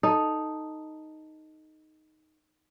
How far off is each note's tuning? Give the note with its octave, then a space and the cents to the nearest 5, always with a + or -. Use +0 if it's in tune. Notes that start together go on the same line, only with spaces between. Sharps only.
D#4 +0 A4 +0